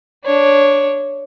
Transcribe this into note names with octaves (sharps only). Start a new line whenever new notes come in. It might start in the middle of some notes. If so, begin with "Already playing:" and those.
D4 C#5